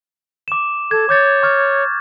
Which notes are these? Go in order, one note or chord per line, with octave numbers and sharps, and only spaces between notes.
D6 E7
A4 G#6
C#5 D6 G6 A6
C#6 F6 G#6